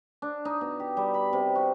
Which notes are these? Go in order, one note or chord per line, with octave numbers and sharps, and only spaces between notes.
D4
D#4
B2
G4
G3
B5
C3
F#4